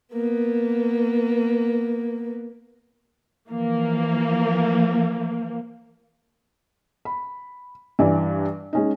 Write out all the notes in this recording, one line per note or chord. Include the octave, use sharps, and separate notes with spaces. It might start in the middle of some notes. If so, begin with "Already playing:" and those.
A#3 B3
E3 F3 A#3
B5
G2 E3 D5
G#3 C#4 D#4